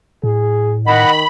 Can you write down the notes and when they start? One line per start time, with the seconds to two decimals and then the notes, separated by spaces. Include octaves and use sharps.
0.24 A2 G#4
0.86 D#3 D#5 F#5 B5